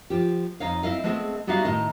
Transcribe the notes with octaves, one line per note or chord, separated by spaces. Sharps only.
F3 G4
F2 D#4 C#5 F5
C4 E4 D#5 F5
G#3 A3 B3 C4 G#4 D#5
G3 B3 D#4 F#4 E5 F5
A2 D#3 D#4 D#5 A5